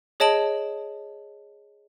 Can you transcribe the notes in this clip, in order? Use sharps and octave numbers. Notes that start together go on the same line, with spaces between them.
G#4 C#5 D#5 A5 D7 F#7